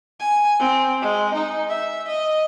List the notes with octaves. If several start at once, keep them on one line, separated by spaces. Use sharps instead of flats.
G#5
C4
G#3
D#4
E5
D#5